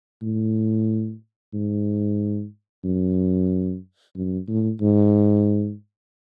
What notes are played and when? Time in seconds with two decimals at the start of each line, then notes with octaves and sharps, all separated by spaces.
0.22 A2
1.54 G#2
2.84 F#2
4.16 F#2
4.48 A2
4.81 G#2